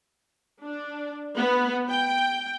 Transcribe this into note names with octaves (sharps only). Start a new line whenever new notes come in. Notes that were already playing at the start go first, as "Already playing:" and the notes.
D4
B3
G5